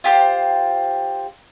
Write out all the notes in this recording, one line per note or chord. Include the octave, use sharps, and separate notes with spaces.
F4 G4 C5